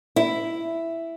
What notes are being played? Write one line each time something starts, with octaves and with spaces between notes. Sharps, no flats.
E4